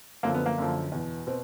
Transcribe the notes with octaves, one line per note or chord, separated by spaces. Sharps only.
F#2 D3 F3 A#3
B3
A#3
F#2 D3 F3
E2 B2
B2 C4